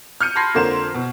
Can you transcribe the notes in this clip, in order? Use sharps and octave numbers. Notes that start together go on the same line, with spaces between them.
F6 G6 C#7 D#7
A5 B5 C6 G#6 A#6 C7
F2 D3 A#3 C5 E7
B2